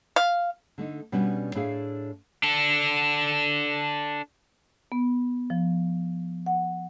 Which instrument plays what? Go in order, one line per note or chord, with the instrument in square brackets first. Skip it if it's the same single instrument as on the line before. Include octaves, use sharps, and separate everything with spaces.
[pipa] F5
[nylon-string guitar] D3 A3 D#4
B2 G3 B3 C#4 D4
A2 A3 D4 G#4 F5
[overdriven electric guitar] D4 A4
[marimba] B3
F3
F#5